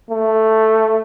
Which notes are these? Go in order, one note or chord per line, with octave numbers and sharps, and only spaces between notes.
A3